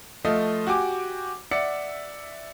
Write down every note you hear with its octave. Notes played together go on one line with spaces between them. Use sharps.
F3 A3 F4 D#5
F#4 G4 G#5 D6
D5 E5 F#5 C#7